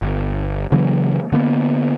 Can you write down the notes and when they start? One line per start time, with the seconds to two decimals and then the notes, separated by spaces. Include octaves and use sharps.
0.02 G1
0.72 C#3 E3 F#3 A#3
1.32 D3 A#3 B3